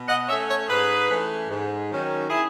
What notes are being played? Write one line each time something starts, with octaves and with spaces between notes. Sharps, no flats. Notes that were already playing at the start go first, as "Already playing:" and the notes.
Already playing: B2
D#5 F#5
A3 C#4 C#5 E5
A4 C#5
G#2 G#4 B4
E3 A3 C#4
G#2
D#3 F#3 C#4
E4 G#4